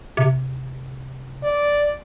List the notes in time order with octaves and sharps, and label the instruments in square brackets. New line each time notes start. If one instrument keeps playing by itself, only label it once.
[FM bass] C3
[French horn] D5